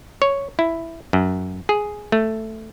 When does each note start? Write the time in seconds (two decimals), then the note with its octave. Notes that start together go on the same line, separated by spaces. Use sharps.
0.22 C#5
0.59 E4
1.13 F#2
1.69 G#4
2.12 A3